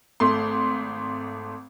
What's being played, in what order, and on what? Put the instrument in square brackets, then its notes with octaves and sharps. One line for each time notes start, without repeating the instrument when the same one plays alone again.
[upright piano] G#1 A3 C6